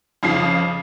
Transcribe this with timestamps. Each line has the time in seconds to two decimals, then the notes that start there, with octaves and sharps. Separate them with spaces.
0.23 F2 C#3 F3 C7